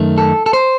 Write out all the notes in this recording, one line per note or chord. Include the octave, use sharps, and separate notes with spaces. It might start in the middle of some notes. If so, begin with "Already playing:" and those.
Already playing: F#2 D#3 A3
A4
A4
C5